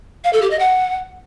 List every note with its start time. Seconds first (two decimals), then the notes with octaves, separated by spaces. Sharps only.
0.24 F5
0.33 A4
0.42 G4
0.51 D#5
0.59 F#5